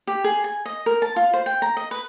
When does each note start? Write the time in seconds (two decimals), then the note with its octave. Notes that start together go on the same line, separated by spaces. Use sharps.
0.07 G4
0.24 G#4
0.44 G#5
0.65 D#5
0.86 A#4
1.02 A5
1.16 F4
1.33 C5
1.46 G5
1.62 A#5
1.77 D#5
1.91 B4